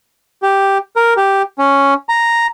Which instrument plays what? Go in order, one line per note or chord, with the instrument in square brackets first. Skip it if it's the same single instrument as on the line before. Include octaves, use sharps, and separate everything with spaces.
[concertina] G4
A#4
G4
C#4
A#5